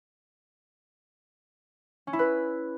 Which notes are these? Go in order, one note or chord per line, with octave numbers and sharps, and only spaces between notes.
C#4
E4
B4